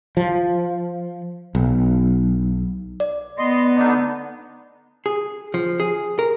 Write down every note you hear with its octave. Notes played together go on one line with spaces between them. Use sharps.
F3
B1
D5
B3 D#5 C6
D3 D4 D#4
G#4
F3
G#4
A#4